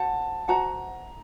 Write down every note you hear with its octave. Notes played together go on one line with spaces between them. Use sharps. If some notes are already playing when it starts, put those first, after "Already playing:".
Already playing: F#4 C5 F#5 A5
F#4 C5 F#5 A5 A#5